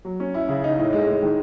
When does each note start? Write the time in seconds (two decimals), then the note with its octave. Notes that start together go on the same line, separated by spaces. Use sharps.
0.05 F#3
0.20 C#4
0.34 E4
0.49 C#3
0.64 D#4
0.78 A2
0.93 G#3
1.07 G#3
1.22 D#3